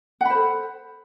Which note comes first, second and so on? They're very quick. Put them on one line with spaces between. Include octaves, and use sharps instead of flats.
F#5 B5 C5 A4